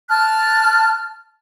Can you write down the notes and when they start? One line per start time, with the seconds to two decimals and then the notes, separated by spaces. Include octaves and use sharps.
0.10 A5 F6 F#6